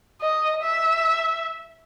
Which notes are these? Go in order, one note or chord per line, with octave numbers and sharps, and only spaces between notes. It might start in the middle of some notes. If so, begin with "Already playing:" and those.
D#5
E5